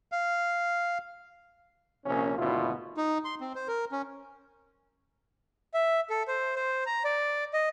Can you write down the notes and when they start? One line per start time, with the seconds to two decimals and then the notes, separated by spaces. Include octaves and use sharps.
0.12 F5
2.06 A#1 C3 A#3 C#4
2.37 G#1 D2 B2 E4 F4
2.97 D#4
3.25 C6
3.41 C4
3.56 C5
3.68 A#4
3.92 C#4
5.74 E5
6.10 A4
6.28 C5
6.56 C5
6.86 A#5
7.04 D5
7.53 D#5